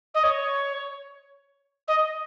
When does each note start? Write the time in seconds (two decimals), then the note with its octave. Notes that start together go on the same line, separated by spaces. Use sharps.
0.14 D#5
0.23 C#5
1.87 D#5